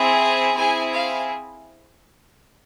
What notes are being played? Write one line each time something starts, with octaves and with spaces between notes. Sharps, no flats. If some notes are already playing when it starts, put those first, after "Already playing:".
Already playing: C4 E4 G#4
G#5
C4 E4 G#4 G#5
F5